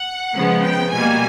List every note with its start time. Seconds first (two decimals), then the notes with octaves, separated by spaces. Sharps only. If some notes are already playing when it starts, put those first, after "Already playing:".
Already playing: F#5
0.34 C#3 F3 G#3 B3
0.64 G5
0.92 B2 G3 A#3 G#5